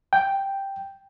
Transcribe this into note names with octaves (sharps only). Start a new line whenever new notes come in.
G5